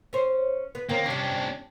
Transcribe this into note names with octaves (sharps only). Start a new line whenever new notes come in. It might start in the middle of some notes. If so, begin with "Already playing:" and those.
C#4 C5
B3
D#3 A#3 C4 C#4
C3 G3 C#4 D4